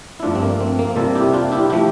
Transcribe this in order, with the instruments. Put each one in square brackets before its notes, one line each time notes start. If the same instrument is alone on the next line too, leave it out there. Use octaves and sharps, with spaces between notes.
[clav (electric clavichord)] E4
G2 F3 A3 D4 F4
C4
A#3
C4
A#3
C3 G3 A#3 F4 A4
E4 G4
D4 F4
E4 G4
F3 A3 E4 G4